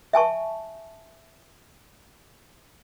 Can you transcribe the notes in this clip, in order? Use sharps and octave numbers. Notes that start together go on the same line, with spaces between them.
E5 G#5 A5 C#6